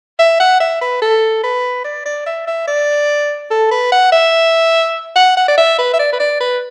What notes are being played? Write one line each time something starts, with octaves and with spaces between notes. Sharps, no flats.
E5
F#5
E5
B4
A4
B4
D5
D5
E5
E5
D5
A4
B4
F#5
E5
F#5
F#5
D5
E5
B4
E5
D5
B4
D5
B4